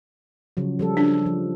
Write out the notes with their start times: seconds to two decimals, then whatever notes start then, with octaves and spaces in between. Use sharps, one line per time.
0.57 C#3 F3 F#3
0.79 F3 G3 A4
0.97 D4
1.26 F3